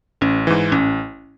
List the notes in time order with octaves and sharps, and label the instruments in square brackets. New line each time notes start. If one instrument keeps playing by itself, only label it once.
[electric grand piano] A1 [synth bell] C#4
[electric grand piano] G#2 E3
[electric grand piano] A1 [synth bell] C#4